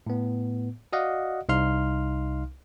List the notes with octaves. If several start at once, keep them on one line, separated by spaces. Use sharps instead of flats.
A2 B3
F#4 D5 D#5 F5 F#5
C2 D#4 F5 C6 F6